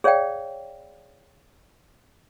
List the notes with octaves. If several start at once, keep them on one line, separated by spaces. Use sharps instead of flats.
G#4 C#5 D5 F5 G5